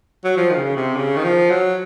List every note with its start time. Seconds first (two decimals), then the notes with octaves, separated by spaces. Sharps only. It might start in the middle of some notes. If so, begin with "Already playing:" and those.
0.25 F#3
0.37 F3
0.50 D#3
0.56 C#3
0.76 C3
0.97 C#3
1.17 D#3
1.24 F3
1.50 F#3